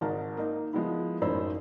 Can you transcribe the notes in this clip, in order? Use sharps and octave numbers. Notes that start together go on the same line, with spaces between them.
G#1 G#2 A#4 A5
A#3 D#4
F3 G#3 B3 E4
A1 F#2 D#4 C5 B5 E6